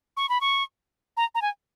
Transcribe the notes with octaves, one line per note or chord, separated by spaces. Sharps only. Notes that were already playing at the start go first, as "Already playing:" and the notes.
C#6
B5
C#6
A#5
A#5
G#5